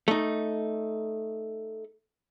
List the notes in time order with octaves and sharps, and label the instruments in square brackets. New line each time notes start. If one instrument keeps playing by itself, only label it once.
[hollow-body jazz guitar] A3 D#4